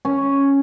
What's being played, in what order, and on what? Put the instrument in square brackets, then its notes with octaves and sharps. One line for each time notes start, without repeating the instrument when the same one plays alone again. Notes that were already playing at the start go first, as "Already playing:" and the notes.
[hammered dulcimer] C#4